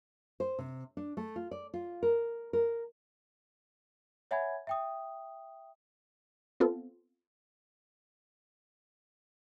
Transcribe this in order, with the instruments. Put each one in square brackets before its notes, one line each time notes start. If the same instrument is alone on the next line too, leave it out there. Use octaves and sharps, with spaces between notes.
[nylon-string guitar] C5
C3
D4
A3
F4
D5
F4
A#4
A#4
[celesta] C#5 E5 F#5 G#5 B5 G#6
E5 G5 D#6
[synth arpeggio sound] B3 C4 F4 A4